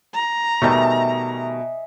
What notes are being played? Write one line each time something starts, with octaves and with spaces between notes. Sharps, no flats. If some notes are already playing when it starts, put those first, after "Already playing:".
A#5
B2 D#3 G3 A3 D#5 E5 G#5